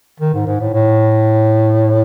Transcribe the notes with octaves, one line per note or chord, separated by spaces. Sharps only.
D#3
G#2
G#2
A2
A2